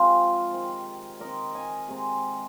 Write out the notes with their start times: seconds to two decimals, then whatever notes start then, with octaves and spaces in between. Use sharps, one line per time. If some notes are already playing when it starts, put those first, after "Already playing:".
Already playing: C3 F3 G#3 C4 F4
0.52 D#3 C4
1.20 D#3 C4 A#4 D#5
1.54 D#5 G#5
1.88 C3 G#3 C4